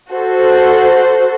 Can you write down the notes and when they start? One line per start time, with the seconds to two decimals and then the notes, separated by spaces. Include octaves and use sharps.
0.11 F#4 A4 C5